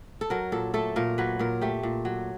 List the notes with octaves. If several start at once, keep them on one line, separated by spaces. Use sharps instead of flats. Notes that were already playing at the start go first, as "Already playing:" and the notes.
A4
F#3 A#4
A#2 A4
A3 A4
A#2 A#4
F#3 B4
A#2 A#4
A3 G4
A#2
F#3